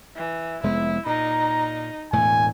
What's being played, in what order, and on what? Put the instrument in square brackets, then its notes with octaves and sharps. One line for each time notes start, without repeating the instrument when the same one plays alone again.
[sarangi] E3
[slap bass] F1 G#3 B3 [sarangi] E4
[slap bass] A#2 [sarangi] D#4 [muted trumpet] A#5
[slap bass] E1 A2 A3 [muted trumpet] G#5